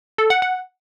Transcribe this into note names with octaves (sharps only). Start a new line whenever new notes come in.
A4
F#5
F#5